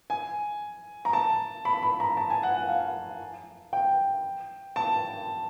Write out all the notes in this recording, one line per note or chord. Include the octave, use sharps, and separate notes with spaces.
G#5
A#5
A5
B5
B5
A#5
A5
G#5
F#5
F#5
F5
G5
A5